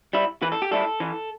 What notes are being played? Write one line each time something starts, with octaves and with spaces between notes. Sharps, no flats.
G3 E4
E3 B4
A4
G4
G3 E4 A4
E3